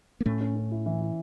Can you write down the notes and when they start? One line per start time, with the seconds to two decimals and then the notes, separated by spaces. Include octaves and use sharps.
0.21 A#3
0.25 A2 A3 C#4
0.41 C#4
0.56 C#4
0.71 E4
0.86 E3
1.01 E4